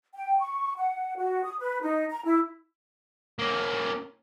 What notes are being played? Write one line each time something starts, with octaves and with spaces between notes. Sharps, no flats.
G5
C#6
F#5
F#4
D#6
B4
D#4
A#5
E4
A#3 C#4